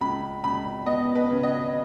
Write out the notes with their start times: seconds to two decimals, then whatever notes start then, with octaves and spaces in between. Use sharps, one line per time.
0.01 C#2 B5
0.44 C#2 B5
0.86 B3 D#5
1.15 B4
1.30 C#3
1.43 D#5